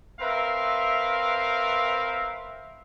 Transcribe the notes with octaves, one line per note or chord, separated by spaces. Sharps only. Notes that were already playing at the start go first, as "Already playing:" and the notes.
C4 A#4 B4 E5 F5